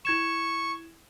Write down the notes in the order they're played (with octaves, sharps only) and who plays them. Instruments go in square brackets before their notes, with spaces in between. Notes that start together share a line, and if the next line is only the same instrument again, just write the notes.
[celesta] E4 G#6 E7 [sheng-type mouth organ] C#6